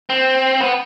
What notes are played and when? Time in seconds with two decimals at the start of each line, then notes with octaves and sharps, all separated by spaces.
0.10 C4
0.61 B3